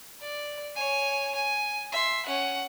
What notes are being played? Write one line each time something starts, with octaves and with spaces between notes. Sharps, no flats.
D5
C#5 G#5
G#5
E5 C6
C#4 F#5